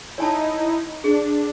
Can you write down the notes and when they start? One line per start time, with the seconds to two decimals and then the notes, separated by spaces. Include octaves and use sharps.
0.18 D#4 E4 C#5 G#5 A5
1.04 D4 G#4